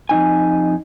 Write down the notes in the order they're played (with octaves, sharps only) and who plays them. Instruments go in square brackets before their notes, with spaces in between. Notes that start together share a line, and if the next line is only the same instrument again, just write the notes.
[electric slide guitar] F2 C#3 D#4 G#5